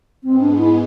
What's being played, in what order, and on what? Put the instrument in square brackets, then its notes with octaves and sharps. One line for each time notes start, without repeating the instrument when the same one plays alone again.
[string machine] G#2 G#3 B3 [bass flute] C4
[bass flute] D4
E4